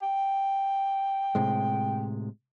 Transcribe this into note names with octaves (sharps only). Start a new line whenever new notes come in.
G5
A2 C3 G#3